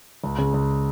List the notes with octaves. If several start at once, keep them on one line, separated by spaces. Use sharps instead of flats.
C#2
C#3
C#2